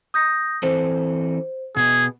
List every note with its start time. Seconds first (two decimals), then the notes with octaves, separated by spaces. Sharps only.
0.14 D#6 G6 A#6
0.63 E3 C4 A4 C5
1.76 B2 B3 G#4